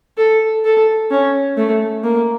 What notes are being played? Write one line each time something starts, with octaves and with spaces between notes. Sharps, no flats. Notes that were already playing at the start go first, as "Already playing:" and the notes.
A4
A4
C#4
A3
A#3